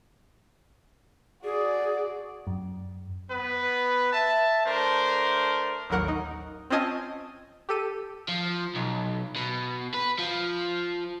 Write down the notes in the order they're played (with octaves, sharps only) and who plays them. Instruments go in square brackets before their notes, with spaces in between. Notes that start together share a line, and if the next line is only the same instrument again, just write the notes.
[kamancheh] F#4 D5 [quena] G#4
[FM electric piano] F#2
[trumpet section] B3 B4
E5 A5
A3 D4 A#4 C5
[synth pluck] A1 D#2 F#3 A#4 F#5
D#4
C4 C#4 F4 D#5 G#5 A5
G4 A4 D#7
[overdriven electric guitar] F3
B1
B2
B4
F3